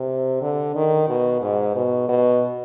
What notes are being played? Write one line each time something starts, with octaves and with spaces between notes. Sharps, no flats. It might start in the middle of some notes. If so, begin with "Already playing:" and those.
Already playing: C3
D3
D#3
B2
G#2
B2
B2